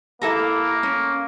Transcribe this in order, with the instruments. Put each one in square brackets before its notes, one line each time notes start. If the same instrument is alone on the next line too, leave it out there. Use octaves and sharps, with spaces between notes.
[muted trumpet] A#3 [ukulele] E4 A4 A#4
[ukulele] C#4